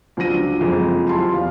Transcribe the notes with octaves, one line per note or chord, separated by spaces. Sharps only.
C#2 F3 F#3 D4 A#6 D#7
F#1 F2 G#3 G#4
E4 F4 G4 A5 C6
E1 F5